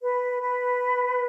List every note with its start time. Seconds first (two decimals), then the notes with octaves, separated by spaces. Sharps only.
0.01 B4
0.41 B4